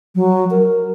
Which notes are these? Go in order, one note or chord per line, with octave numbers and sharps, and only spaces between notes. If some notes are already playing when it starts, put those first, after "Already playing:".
F#3
A#4